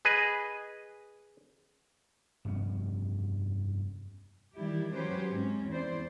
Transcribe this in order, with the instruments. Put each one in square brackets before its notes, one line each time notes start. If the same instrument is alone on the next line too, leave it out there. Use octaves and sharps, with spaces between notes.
[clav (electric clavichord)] G#4 B4 D#5
[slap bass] F1 G2 B3 C#4
[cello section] D#3 E3 G3 E4 G4
F#3 C#4 G4 B4 C5
G#2 C4 C#4
E2 E4 C5 D5